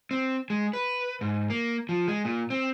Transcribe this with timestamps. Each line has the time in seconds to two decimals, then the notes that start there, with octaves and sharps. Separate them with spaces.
0.11 C4
0.50 G#3
0.73 B4
1.21 G#2
1.50 A#3
1.89 F3
2.08 G#3
2.25 A#2
2.50 C4